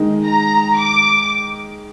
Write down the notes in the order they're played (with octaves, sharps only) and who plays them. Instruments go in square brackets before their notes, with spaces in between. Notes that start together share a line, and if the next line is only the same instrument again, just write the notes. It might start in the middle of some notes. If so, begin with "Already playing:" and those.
Already playing: [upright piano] D#3 G#3 D#4
[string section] A#5
D6